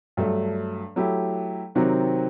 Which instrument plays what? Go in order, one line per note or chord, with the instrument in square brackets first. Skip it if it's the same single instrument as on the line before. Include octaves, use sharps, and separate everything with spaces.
[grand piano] G2 F#3 A3
F#3 A3 E4 G4
C3 D#3 F#3 C4 F#4